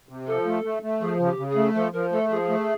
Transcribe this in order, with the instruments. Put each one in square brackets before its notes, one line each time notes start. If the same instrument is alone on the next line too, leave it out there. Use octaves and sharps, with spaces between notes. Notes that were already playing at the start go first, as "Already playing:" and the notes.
[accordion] C3
[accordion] F3 [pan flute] A4
[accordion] A3
A3
A3
[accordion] F3 [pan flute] G#4
[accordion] C#3
[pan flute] G4
[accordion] C#3
[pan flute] G#4
[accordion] A3
[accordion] F3 [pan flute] A4
[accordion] F3 [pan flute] A#4
[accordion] A3 [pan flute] A4
[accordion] F3 [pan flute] G#4
[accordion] A3